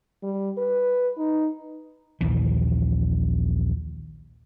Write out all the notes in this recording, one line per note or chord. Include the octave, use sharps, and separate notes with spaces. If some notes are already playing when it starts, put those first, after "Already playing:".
G3
B4
D#4
A#1 D#2 E3